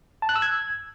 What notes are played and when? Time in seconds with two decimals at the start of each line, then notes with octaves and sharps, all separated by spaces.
0.22 A5
0.29 F#6
0.36 E6
0.42 G#6